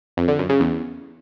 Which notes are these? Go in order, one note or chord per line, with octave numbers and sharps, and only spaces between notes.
F2
D3
F#2
C#3
E2